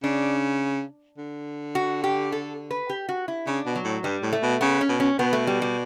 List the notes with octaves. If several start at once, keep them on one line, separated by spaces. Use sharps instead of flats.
C#3 D4
D3
F#4
G4
A4
B4
G4
F#4
E4
C#3 D4
B2
F#3
A2
G2 G3
A2
A3
B2
C#3 B3
C#4
B2
C#4
B2 B3
A3
G3
G3